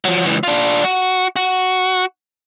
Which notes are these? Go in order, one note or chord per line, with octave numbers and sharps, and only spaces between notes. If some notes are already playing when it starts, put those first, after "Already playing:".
F3 F#3
C#2 E3
D4 F4
F#4
F#4